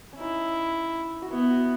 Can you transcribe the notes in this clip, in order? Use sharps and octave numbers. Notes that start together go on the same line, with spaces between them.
C#4
D#4 E4
F#4
B3 E4
F#4